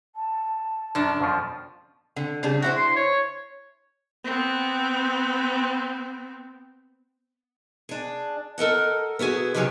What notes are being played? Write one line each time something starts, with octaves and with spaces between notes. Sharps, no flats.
A5
F#2 D4 F#4 A#4 F#5
F2 B2 F3
D3
C#3 G3 D4
D4 E4 F#4 C5
C6
C#5
B3 C4
D4 G#4
A4 A#4 D#5 F#5
B3 E4 F#4 G#4
C3 D#3 F3 F#3 G4 G#4